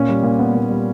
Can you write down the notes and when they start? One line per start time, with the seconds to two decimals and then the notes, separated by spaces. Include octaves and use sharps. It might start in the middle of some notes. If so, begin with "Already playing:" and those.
Already playing: A#2 C#4
0.09 G3
0.23 A#2
0.39 B3
0.55 A#2
0.69 G3